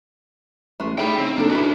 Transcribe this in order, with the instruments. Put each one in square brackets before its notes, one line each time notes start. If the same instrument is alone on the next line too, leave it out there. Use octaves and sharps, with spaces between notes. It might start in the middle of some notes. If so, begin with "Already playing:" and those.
[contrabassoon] A1 [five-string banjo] G#3 A3
[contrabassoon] A2 [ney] D#4 [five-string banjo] G4 G#4 E5 [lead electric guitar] G5 B5
[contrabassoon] C#3 [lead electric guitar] C4
[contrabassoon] F#1 [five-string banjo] A#3 A4 [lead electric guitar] D4
[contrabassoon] B2 [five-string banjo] B3 E4 [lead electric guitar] C#4 D4